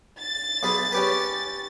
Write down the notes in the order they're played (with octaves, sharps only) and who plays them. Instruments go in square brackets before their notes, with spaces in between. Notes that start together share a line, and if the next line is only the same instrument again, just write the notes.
[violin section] A6
[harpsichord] B1 G#4 B5
C#4 G4 B4